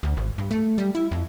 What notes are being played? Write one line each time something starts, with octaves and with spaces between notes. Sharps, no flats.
D2
G#1
G2
A3
G3
E4
F2